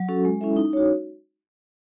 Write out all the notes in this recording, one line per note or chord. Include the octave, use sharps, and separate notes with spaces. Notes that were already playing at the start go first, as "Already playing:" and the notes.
Already playing: F#3
C#4 F#4 A4
G#3
C#4 E4 A4 E5
D#4
F#4 C#5